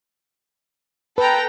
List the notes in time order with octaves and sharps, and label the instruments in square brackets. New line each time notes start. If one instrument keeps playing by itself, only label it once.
[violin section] A4 G5 A#5 [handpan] B4